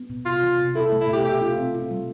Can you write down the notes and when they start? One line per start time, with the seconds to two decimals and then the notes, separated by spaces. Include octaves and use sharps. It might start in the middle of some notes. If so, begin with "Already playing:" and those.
Already playing: B3
0.10 B2
0.25 C3 F4
0.43 E3
0.58 C3
0.75 E4 A4
0.92 A3
1.01 E4
1.08 B2 G4
1.24 G4 E5
1.42 F4
1.58 C4
1.75 F4
1.91 G3